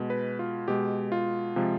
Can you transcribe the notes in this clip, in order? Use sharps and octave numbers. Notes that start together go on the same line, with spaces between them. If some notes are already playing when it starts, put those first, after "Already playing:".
Already playing: B2 G#3
B4
F4
B2 G#3 G4
F4
C3 F3 G#3